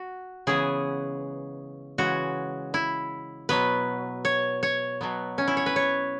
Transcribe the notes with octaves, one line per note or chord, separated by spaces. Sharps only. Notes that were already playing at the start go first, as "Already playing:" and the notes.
Already playing: F#4
C#3 E3 G#3 B3 G#4
C#3 E3 G#3 F#4
E4
B2 F#3 B3 B4
C#5
C#5
B2 F#3 B3
C#4
E4
C#5
B4
C#5